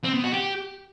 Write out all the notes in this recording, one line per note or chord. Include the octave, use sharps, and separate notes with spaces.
C4
B3
F#4
G4